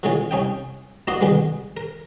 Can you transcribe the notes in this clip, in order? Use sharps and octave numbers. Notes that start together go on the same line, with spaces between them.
B2 D3 E3 G#3 C#4 F4
C2 C#4 D#4 G5
A#3 D4 F#4 B4 D#5 C6
C2 B2 D3 D#3 G3 G#3
A#4